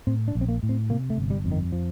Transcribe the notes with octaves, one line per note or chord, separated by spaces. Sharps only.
A2 C4
D4
A#1
C4
A#3
A2
C4
C3 A#3
A3
G1
G3
F2
D#3
F3